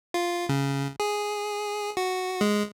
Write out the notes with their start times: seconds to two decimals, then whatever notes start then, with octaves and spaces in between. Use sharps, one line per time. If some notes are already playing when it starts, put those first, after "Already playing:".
0.14 F4
0.49 C#3
1.00 G#4
1.97 F#4
2.41 G#3